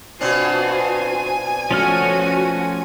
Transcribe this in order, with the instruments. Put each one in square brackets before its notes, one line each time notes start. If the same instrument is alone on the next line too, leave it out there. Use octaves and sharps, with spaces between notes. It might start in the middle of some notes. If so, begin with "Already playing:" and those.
[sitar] B2 C4 D4 [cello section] F4 F#4 C5 [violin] G#5
[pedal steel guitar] F3 C#4 F6 [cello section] A3 F#4